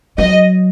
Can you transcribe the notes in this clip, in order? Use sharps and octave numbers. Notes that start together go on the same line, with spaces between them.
F#3 D#5